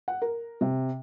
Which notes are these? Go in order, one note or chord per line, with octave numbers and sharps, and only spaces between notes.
F#5
A#4
C3